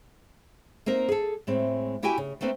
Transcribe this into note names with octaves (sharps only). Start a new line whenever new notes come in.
A#3 C4 D#4 A#4
G#4 A4
A2 G#3 C4
A#3 E4 F#4 G4 G5 G#5
C#3
A3 A#3 C4 B4